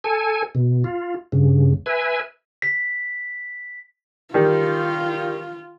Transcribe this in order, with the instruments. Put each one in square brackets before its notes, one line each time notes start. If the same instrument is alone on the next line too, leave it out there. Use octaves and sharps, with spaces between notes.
[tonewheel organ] A4 G#5
B2
F4
G2 C#3
B4 E5 G#5
[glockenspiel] B6
[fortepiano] D#3 G3 [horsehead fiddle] F4